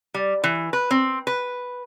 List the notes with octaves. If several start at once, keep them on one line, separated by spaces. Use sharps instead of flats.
G3
E3
B4
C4
B4